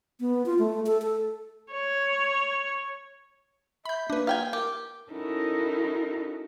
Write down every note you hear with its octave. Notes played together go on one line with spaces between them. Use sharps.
B3
F4
A3
A4
A4
C#5
E5 B5 G6
A#3 D4 B4
F5 G5 G#5
G4 A#4
C#4 D#4 E4 F#4 A4 A#4